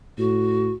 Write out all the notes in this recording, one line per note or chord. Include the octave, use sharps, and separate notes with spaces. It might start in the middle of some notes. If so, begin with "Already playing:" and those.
A2 F#4